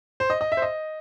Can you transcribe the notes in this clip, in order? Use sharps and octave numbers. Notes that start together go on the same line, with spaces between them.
C5
D#5
D#5
E5
C5
D#5